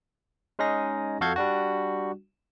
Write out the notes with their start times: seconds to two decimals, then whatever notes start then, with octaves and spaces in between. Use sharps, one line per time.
0.59 G#3 C#4 D#4 G#4 A#6
1.21 F2 F#4 A4 F5 G6 G#6
1.36 G3 D4 F#4